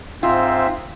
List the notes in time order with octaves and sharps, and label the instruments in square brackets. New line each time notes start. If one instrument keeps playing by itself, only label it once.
[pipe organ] G#2 C4 E5 [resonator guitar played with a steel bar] F4